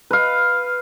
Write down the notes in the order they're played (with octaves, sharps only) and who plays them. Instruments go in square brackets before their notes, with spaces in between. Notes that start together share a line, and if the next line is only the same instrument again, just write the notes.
[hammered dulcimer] B4 F5